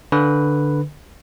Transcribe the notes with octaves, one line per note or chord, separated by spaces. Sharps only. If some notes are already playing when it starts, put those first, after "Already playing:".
D3 B4